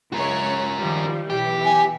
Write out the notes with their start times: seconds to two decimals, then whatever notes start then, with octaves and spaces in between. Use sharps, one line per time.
0.12 C#2 F#4 A#4 C#5
0.79 D#3 F3 G3
1.30 B1 E3 G4
1.65 G#5